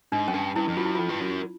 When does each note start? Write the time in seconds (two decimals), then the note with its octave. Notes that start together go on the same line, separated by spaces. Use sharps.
0.12 G#2 D4
0.27 F#2 C#4
0.34 G2 D4
0.56 G2 E4
0.68 F2
0.76 F#2 F4
0.86 E4
0.95 F2 F4
1.09 G2
1.20 F#2